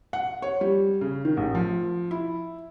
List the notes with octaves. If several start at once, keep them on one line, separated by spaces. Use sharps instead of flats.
F#5
C#5
G3
C#3
D#3
A1
F3
E4